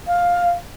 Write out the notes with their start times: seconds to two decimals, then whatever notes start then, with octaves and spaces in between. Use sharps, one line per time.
0.07 F5